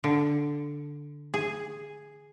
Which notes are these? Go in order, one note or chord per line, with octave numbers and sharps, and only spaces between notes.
D3
G#4